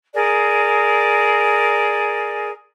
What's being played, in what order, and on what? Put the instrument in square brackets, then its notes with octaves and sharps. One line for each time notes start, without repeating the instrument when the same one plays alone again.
[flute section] G#4 A#4 D5